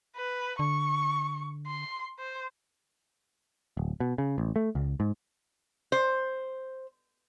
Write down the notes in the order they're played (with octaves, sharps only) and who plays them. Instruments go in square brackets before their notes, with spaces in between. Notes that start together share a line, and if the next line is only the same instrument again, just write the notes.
[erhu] B4
[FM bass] D3 [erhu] C#6
[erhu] C6
C5
[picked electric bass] D1
B2
C#3
A1
A3
C#2
G#2
[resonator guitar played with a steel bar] C5